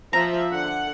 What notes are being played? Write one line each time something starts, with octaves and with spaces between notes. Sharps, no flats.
F3 E5 A#5
D3 F#5